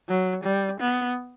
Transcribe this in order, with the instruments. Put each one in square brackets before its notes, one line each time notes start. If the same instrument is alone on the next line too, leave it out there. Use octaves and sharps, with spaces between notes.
[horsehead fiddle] F#3
G3
B3